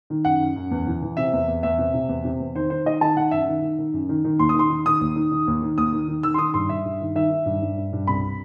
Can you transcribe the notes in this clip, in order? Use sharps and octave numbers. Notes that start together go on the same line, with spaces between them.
D#3
F#2 F#5
F#2
F#2
E2
E3
E3
C3 E5
E2
E2
E2 E5
C3
C3
E2
C3
E2
D#3 C5
D#3 C5
D#3 D#5
D#3 A5
D#3 F#5
F#2 E5
D#3
D#3
D#3
F#2
D#3
D#3
D#2 C6
D#6
D#3 C6
D#3
D#3 D#6
D#2
D#3
D#3
D#2
D#3
D#2 D#6
D#3
D#3
D#3 E6
C6
D#3 D#6
G2 C6
G2 E5
G2
D#3
D#3 E5
D#3
G2
G2
G2
G2
C2 B5